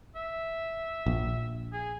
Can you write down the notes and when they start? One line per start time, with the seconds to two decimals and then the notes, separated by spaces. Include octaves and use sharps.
0.15 E5
1.06 A#1
1.73 G#4